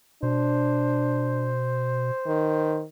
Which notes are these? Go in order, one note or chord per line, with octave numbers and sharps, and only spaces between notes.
B2 D4 C5
D#3